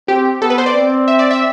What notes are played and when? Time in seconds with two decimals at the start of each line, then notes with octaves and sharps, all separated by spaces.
0.08 C4 G4
0.42 B3 A4
0.50 B4
0.58 C5
0.66 D5
0.75 C4
1.08 E5
1.19 D5
1.31 E5